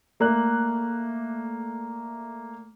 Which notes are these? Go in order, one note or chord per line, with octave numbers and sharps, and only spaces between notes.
A3 A#3 D5 F#6